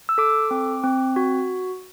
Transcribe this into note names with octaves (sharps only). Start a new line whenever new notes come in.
E6
A4 D6
C4
C4
F#4